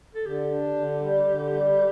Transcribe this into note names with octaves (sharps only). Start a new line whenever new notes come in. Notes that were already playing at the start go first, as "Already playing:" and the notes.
A4
D3 G4
D4
D3
G3
D3
G3